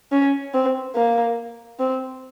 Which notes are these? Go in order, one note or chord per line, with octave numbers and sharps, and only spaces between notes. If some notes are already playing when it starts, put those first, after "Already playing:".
C#4
C4
A#3
C4